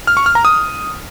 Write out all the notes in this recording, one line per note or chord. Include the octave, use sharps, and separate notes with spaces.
F6
C#6
F6
A#5
D#6